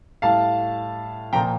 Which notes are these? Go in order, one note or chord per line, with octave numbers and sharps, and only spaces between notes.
A2 G3 F5 A5
A#2 F3 G5 A#5